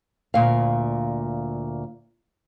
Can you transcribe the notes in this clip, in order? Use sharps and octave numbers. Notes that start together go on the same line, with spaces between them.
D2 A#2 F5